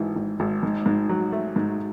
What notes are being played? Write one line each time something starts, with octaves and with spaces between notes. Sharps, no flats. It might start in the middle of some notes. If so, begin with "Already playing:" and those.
Already playing: G#1 G#2 E3
G#1
G#1
G#2
G#2
F#3
A3
G#2